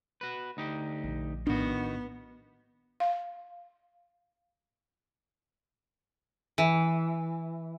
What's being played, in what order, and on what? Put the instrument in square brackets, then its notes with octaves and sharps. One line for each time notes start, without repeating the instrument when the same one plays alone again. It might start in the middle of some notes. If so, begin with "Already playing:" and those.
[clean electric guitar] F#4 B4
D2 D#4 G4
[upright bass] A#1
[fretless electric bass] A2 D4 [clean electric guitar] D#3 F#4 [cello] B3
[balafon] F5
[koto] E3